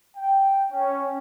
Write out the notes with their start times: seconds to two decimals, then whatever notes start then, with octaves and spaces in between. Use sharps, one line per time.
0.17 G5
0.72 C#4